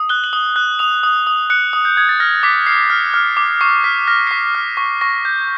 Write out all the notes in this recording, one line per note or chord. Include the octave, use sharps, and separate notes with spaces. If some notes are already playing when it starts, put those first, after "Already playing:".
Already playing: D#6
F#6 G7
F#7
D#6 G7
F#6
D#6 F7
D#6
D#6
F#6 C#7
D#6
G6
D#6 G#6
A6
F6 A#6
D6 B6
F6 C7
F6
F6
D6
C#6 C7
F6 B6
F6 A#6
C7
C#6 B6
F6
C#6
C#6 A#6
G6